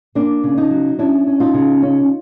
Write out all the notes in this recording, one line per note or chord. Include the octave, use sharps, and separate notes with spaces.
A#3 D4
C#3
D#4
F#3
C#4 D4 E4
C#4
D#4 F4
C#3
C#4